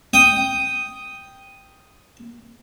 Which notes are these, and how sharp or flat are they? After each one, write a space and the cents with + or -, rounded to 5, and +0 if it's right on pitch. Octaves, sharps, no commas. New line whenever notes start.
G5 +0 D#6 +0